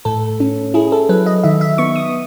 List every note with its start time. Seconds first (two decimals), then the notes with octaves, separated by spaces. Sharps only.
0.05 A2 A4
0.40 C#4
0.74 E4 G#4
0.92 A4
1.09 F#3 B4
1.26 D#5
1.44 D#3 E5
1.61 E5
1.78 B3 C#6
1.96 D#6